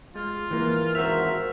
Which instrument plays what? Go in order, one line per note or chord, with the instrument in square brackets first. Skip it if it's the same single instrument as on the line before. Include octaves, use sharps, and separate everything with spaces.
[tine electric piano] G#3 [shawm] F4
[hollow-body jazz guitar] E3 A#3
[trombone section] G#1 A#4 [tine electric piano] F#4 C5 F6 [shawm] E5